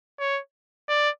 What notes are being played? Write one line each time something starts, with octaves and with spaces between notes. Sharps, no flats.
C#5
D5